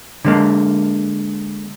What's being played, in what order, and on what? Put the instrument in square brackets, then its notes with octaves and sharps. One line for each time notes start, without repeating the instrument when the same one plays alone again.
[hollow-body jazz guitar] D3 G#3 A#3